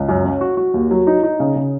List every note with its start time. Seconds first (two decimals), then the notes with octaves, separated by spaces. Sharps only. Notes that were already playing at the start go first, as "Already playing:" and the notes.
Already playing: C#2
0.09 F#2
0.25 C#4
0.41 F#4
0.57 F#4
0.74 D#2
0.91 F#3
1.07 D#4
1.23 D#4
1.40 C#3
1.56 C#3